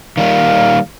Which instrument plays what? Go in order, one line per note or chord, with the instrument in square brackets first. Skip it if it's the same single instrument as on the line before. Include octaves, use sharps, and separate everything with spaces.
[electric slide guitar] D#3 G3 A#3 [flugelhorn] F5